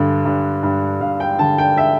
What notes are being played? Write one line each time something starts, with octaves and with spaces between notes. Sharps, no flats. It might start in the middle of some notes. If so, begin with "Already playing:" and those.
Already playing: G2 D3
G2
G2
G2 F5
G5
D3 A5
G5
E5